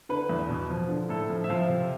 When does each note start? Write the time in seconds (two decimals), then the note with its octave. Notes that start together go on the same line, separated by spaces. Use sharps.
0.09 D3 B4
0.29 E2
0.49 B2
0.70 F3
0.89 D3
1.09 A2 A4
1.30 F3
1.44 E5
1.49 F3 F5
1.69 C3